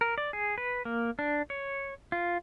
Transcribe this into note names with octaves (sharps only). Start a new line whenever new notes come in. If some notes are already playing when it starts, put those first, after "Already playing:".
A#4
D5
G#4
B4
A#3
D4
C#5
F4